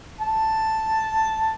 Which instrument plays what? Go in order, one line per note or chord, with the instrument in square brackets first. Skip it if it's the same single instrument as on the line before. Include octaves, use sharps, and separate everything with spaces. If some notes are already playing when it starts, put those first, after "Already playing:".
[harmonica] A5